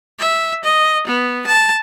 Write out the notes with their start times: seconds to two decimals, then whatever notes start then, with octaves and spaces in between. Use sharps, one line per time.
0.19 E5
0.64 D#5
1.07 B3
1.47 A5